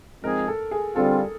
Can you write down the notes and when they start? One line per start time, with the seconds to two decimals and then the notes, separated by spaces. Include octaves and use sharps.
0.23 F3 G#3 C4 D#4 G#4 A#4
0.48 A4
0.71 G#4
0.96 D3 G3 C4 F4 A4